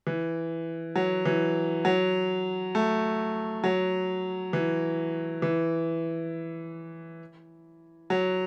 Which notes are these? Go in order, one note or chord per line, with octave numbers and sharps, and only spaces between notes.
E3
F#3
E3
F#3
A3
F#3
E3
E3
F#3